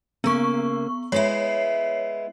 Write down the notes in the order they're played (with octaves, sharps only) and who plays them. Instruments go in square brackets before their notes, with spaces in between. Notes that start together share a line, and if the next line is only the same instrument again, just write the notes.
[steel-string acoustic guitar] C#3 A#3 [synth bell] B3 C#6
[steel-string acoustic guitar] G#3 B3 E4 [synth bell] C#5 C7